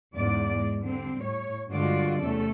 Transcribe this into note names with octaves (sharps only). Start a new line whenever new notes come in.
E2 G#2 C#3 D5
G#3
D3 G3 C4
A2 C#5
G2 D3 G#3 F4 F#4 D5
E2 C3 A3 C#4 A4